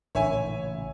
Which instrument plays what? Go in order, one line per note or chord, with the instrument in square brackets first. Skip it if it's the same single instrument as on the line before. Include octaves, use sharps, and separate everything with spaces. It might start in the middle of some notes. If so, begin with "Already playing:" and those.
[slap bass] A1 A#2 C#3 [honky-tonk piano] C#5 E5 G#5